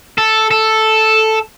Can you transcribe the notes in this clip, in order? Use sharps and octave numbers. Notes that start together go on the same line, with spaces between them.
A4
A4